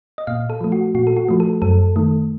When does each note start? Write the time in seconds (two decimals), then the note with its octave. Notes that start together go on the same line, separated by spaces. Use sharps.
0.18 D#5
0.27 A#2 F5
0.50 A4
0.61 F3 A3
0.72 F#4
0.95 A#2 F#4
1.07 A4
1.17 F#4
1.29 F3 A3
1.40 A4
1.62 F#2 A4
1.96 D#3 A3